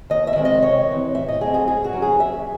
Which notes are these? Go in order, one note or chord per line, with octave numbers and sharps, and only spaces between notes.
D#2 D#5
E5
D#3 G#3 C4
D#5
C3 C#5
E3 C4
A2 E5
D#5
F#3 A3 C4 G#4
G#4
G#2 G#4
F#4
F#3 C#4
G#4
D#2 E5